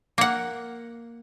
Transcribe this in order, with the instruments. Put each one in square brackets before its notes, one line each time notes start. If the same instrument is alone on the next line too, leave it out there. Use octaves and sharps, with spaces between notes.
[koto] A#3 F#5